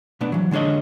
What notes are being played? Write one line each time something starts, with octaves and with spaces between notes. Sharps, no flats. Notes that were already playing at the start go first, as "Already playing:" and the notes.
B2 A3 B3 D4
E3 F#3
D3 G#3 D4 C#5 D#5